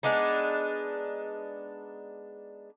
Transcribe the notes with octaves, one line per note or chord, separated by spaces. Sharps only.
G#3 B3 D4 D#4